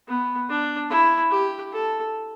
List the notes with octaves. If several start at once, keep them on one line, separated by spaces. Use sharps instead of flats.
B3
D4
E4
G4
A4